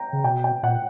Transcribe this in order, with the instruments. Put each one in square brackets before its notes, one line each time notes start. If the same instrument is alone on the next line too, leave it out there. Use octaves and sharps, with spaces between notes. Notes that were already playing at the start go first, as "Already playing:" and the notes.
Already playing: [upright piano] G5 A#5
[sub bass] C#3
[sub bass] B2 [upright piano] G5
[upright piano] G5
[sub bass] A#2 [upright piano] F#5